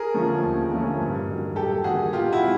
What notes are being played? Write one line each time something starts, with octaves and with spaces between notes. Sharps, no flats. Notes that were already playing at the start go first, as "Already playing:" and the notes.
Already playing: G#4 A#4
D3 F3 A3 C#4
D#2
D3 F3 A3 C#4
G2
D#3 F#3
G2 G4 A4
D#3 F#3 F#4 G#4
B2 F4 G4
E4 F#4
G#3 C4